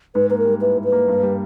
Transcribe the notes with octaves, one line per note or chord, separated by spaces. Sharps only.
G#2 B4
A#3 B4
A#4
G3
E4 B4
G#2
B4
A#3
G2
G3